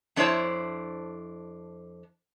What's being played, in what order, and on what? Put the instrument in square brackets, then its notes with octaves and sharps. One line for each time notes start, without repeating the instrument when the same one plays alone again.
[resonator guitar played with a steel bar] F2 D4 E4 C5 C#5 A5